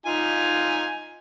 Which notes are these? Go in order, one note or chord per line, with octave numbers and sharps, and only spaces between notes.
D#4 F4 G#5